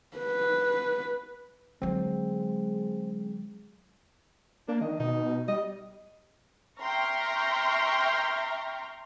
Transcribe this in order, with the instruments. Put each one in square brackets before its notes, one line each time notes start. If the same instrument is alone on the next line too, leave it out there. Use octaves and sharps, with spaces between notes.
[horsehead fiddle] B4
[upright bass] D3 F#3 [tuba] G#3 [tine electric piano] C4
[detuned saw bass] A#3 [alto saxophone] D4
[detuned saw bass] D#3 [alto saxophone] D#5
[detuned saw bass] B2 [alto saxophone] D#4
[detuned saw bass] G3 [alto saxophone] D#5
[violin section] E5 G5 A#5 C6 C#6 F6